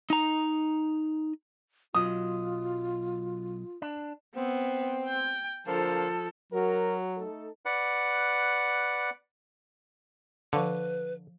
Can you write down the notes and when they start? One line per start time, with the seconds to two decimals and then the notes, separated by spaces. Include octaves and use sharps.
0.10 D#4 A#5
1.95 B1 F#3 F4 D#5 D#6
3.82 D4
4.35 B3 C4
5.08 G5
5.67 D3 F3 A#3 A4 C5
6.52 F#3 F#4 A#4
7.18 A3 D#4 A4
7.65 B4 D5 F#5
10.53 D3 F3 B4 F5